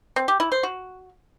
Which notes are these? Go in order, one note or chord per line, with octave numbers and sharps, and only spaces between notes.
C4
G4
E4
C5
F#4